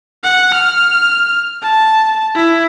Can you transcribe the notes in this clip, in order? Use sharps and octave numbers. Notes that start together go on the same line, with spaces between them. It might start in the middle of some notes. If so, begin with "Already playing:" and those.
F#5
F6
A5
E4